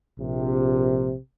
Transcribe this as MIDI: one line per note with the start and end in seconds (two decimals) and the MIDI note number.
0.19 1.15 34
0.19 1.15 48